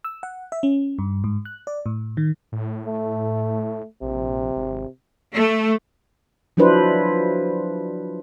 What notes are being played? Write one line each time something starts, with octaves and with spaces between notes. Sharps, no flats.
E6
F#5
E5
C#4
G2
G#2
F#6
D5
A2
D#3
A2
A3
A#1 C3
G#1
A3
F3 F#3 D4 E4 B4 C5